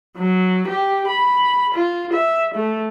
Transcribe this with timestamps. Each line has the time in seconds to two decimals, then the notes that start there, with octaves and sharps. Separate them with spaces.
0.17 F#3
0.68 G4
1.08 B5
1.75 F4
2.13 E5
2.55 A3